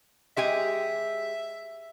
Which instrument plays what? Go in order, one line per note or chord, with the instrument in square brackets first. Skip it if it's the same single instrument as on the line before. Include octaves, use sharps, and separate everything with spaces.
[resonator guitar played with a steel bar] G#3 G4 G#5 [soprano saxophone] E5